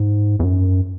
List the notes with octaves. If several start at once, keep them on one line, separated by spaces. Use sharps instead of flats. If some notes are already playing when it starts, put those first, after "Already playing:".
Already playing: G#2
E2
F#2